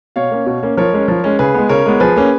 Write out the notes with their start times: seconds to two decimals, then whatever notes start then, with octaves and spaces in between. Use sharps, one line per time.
0.16 B2 C#5 F5
0.31 A#3 C#4
0.46 B2
0.63 A#3 C#4
0.77 F3 A#4 C#5
0.93 G#3 C#4
1.08 F3
1.24 G#3 C#4
1.39 C#3 G#4 B4
1.54 G#3 B3
1.69 C#3 A#4 C#5
1.86 G#3 B3
2.00 F3 G#4 B4
2.16 A#3 C#4